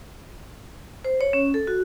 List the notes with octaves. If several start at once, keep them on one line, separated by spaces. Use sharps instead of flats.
C5
C#5
C#4
A4
F#4